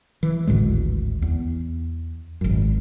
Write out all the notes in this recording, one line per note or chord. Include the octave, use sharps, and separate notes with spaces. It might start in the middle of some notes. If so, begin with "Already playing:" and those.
E3
G#1 D2 A2 G#3
E2
G#1 F#2